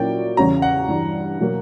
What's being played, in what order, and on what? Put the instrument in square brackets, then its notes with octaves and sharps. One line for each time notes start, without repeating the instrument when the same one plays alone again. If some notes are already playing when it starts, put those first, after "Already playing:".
Already playing: [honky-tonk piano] A#2 F#3 A#3 C#4 E4 [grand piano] D5 G5
[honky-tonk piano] E2 C#3 G3 C#4 F#4 [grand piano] A#5
[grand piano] F#5
[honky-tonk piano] G2 E3 G3
B2 F#3 A#3